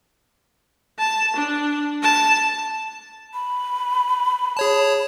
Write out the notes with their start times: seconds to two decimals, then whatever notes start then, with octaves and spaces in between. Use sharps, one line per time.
0.99 A5
1.36 D4
2.03 A5
3.34 B5
4.57 G#4 C#5 A5